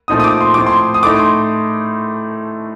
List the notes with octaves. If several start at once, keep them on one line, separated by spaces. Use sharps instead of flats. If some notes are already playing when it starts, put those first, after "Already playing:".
A#2 F3 A3 C4 D#4 D#6
D#6
D6
C6
A2 F3 C4 D6
C6
D#6
A2 A3 D#4 D6
C6